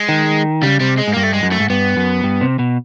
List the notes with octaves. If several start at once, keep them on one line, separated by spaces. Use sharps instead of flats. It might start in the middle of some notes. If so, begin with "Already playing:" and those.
Already playing: G#3
D#3
C#3 G3
C3 G3
G#3
G#2
G2 A#3
A3
G#3
F#2
A3
G#2
G2 B3
F#2
G2
C3
B2